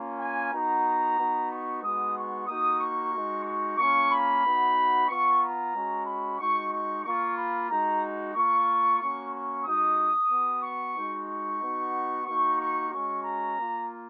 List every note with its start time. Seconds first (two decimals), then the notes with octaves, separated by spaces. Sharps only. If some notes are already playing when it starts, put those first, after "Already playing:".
Already playing: A#3 C#4 F4
0.19 G#5
0.52 B3 D#4 F#4 A#5
1.17 B3 D#4 F#4
1.49 C#6
1.82 G#3 B3 D#4 F#4 D#6
2.15 C#6
2.47 A#3 D#4 F#4 D#6
2.80 C#6
3.13 G#3 D#4 F#4
3.45 C#6
3.78 A#3 C#4 F4 C#6
4.10 B5
4.43 B3 D#4 F#4
5.08 B3 F4 C#6
5.41 A#5
5.73 G#3 C#4 F#4
6.06 B5
6.38 G#3 D#4 F#4 C#6
6.71 C#6
7.04 A#3 F4 C#6
7.36 B5
7.69 G#3 D#4 F#4 A#5
8.34 A#3 F4 C#6
8.99 A#3 C#4 F#4 C#6
9.32 C#6
9.65 G#3 D#4 F#4 D#6
10.30 B3 F#4
10.62 C#6
10.95 G#3 D#4 F#4
11.28 C#6
11.61 B3 D#4 F#4
12.26 A#3 D#4 F#4 C#6
12.58 C#6
12.91 G#3 C#4 F#4 C#6
13.23 A#5
13.56 A#3 F4